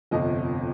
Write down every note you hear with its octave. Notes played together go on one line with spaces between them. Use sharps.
G1 F2 C3 D#5